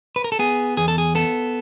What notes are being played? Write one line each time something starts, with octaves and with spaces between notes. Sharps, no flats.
B4
A#4
A4
B3 G#4
E2 G#4
A4
G#4
B3 A4